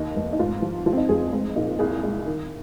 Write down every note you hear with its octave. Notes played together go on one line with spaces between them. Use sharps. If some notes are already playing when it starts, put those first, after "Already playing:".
Already playing: D#2 D#4
F1
D#4
G#2 F4
F3
F3 F4
C4
D#4
F1 G#4
G#3 C4
A#2 D#4
C2 G#4
G#3
D#3